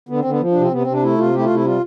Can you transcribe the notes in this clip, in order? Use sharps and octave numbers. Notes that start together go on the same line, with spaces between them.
D3 B3
C4
D3
B3
F3
C3 D4
C4
C3 B3
C4
C3
D4
A3 E4
C3 F4
A3 G4
E4
F4
C3 E4
G3 F4